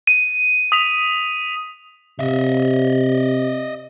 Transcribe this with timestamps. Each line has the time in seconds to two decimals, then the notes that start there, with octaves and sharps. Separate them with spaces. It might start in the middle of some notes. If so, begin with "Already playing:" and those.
0.07 D#7
0.72 D#6 B6 F7
2.19 C3 D#5 E5